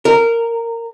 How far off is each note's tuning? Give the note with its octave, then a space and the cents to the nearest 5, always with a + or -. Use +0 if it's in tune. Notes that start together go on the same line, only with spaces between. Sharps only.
A#4 -15